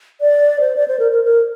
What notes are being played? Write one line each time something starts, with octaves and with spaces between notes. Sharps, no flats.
D5
C5
D5
C5
A#4
A#4
A#4